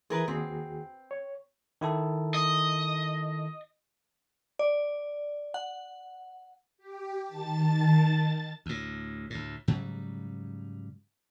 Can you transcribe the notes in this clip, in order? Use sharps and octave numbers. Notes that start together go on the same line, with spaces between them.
E3 G#4 A#4 B4
D#2 C4 F#4 G#4
C#5
D#3 E4 A4
D#5
D5
F#5
G4
D#3 A5 A6
D2 A2
D2 A2
G#2 C#3 F#3 G3